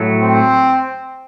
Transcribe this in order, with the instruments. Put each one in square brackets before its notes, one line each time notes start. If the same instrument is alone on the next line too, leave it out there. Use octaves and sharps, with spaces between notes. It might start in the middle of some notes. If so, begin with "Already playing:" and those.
Already playing: [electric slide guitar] A2 F#3 A3
[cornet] C4